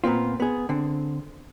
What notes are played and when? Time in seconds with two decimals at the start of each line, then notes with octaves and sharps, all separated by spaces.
0.04 A#2 B3 C4 F4
0.40 B3 G#4
0.69 D3 C4